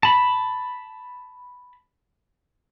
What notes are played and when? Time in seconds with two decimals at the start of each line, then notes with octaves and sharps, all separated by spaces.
0.03 A5 B5